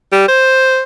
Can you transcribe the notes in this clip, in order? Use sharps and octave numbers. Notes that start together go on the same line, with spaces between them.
G3
C5